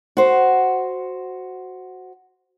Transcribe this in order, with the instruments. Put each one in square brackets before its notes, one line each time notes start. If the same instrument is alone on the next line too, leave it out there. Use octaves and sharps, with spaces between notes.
[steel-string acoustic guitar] F#4 C5